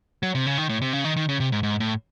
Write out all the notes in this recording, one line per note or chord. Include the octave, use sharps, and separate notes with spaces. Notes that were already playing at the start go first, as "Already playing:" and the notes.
F#3
C3
C#3
D#3
A2
C3
C#3
D#3
D#3
C#3
C3
G#2
G#2
A2